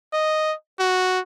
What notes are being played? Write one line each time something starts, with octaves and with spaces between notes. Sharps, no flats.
D#5
F#4